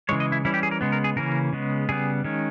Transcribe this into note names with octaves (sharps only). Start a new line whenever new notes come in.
C#3 E3 G#3 C#5
D#5
E4
E3 G3 C#4 E4
G4
G#4
A#4
C#3 G#3 B3
A#4
G#4
C#3 E3 A#3 C#4 A#4
C#3 G#3 B3
C#3 G3 B3 G#4
D#3 G#3 C#4